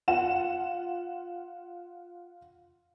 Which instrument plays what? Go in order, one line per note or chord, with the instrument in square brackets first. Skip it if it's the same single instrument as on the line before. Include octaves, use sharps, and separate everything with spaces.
[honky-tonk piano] F4 F#5 E7